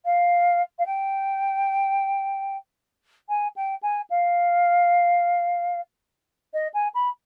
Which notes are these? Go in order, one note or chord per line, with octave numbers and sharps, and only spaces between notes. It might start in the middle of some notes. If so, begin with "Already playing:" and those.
F5
F5
G5
G#5
G5
G#5
F5
D#5
G#5
B5